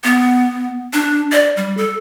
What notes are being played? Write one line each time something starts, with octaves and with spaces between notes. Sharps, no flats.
B3
D4
D5
G3
A4